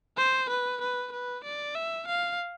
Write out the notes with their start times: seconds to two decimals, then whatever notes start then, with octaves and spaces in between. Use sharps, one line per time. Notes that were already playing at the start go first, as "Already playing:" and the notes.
0.18 C5
0.50 B4
0.81 B4
1.12 B4
1.44 D5
1.75 E5
2.07 F5